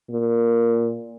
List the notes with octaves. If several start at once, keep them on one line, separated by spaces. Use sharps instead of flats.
A#2